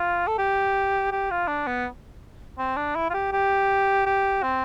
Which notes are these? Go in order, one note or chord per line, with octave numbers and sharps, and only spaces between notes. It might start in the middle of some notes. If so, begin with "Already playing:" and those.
Already playing: F4
A4
G4
G4
F4
D4
B3
C4
D4
E4
F4
G4
G4
G4
C4